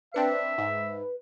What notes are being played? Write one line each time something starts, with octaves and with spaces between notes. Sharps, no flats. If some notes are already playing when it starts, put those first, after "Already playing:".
C4 D4 B4 E5 C#7
G#2